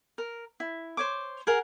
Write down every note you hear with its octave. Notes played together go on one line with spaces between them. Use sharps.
A#4
E4
C5 C#5 D6
G#4 A#4 F#5